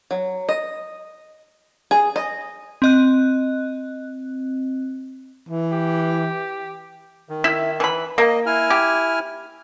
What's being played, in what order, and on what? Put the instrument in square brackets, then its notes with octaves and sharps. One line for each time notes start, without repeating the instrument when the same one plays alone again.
[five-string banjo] F#3
D#5
G#4
D#5
[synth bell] C4 D#5 F#6
[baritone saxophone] E3
[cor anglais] G4
[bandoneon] D#3
[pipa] E4 E5
E3 B5
[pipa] A#3 [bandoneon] D#5
[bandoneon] E4 G#5 F6
[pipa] G4